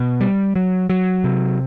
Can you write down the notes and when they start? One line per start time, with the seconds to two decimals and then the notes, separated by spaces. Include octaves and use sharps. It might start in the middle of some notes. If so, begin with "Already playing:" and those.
Already playing: B2
0.21 G3
0.56 F#3
0.90 F#3
1.24 C3